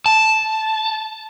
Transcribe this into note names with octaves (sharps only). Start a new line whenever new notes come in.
A5